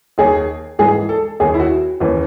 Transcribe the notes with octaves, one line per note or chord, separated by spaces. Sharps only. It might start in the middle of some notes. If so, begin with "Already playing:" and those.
D#2 D#3 G#4
G#2 E3 G#4
A4
D#2 D#3 G#4
E4
F#4
D#2 C#3 E3